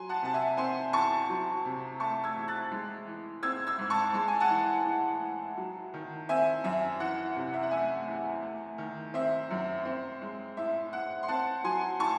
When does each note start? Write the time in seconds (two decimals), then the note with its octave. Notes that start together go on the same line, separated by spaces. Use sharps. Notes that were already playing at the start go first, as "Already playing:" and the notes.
Already playing: F#3 G#5 C6
0.09 F#5 A5
0.22 C3 A5
0.34 E5 G#5
0.57 C4 G#5 C6
0.93 E2 A5 C#6
1.29 F#3
1.65 C3
2.00 A3 A5 C#6
2.24 E6 G#6
2.36 E2
2.48 F#6 A6
2.72 G#3
3.07 E3
3.43 C4 E6 G#6
3.67 E6 G#6
3.78 G#2
3.90 A5 C#6
4.14 G#3 A5
4.28 G#5
4.40 F#5 A5
4.50 E3
4.85 A2
5.22 A2
5.57 F#3
5.94 D#3
6.29 C4 E5 G#5
6.64 F#2 E5
7.00 E3 F#5
7.36 C3
7.54 E5
7.63 F#5
7.71 A3 E5 G#5
8.07 E2
8.42 A3
8.78 D#3
9.14 C4 E5
9.51 F#2
9.85 C4
10.22 G#3
10.57 A2 E5
10.93 A2 F#5
11.23 C6
11.28 C4 F#5 A5
11.64 F#3 G#5 C6
11.99 A2 A5 C#6